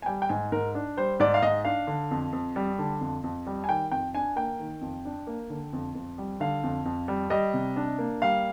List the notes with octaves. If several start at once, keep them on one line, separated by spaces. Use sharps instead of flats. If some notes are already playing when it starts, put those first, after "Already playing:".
G#5
G3 G5
G5
G#2 G#5
G#2 A#4
D4
G3 C5
G#2 D5
F5
G#2 D#5
D4 F5
D3
F2
F2
G3
D3
F2
F2
G3
G#5
D#3 G5
F2 G5
D4 G#5
A#3 G5
D#3
F2
D4
A#3
D3
F2
F2
G3
D3 F5
F2
F2
G3
G3 D#5
C3
D4
A#3
G3 F5